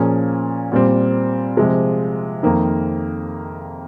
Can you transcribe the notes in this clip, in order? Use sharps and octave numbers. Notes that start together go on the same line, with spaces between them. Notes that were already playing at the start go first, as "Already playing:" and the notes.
Already playing: A#2 F3 A#3 C#4 G#4
A#2 G3 C4
C3 F3 G#3
F2 D#3 A#3